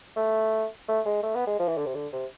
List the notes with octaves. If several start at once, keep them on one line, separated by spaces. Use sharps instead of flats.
A3
A3
G#3
A3
B3
G#3
F3
E3
D3
C3
D3
C3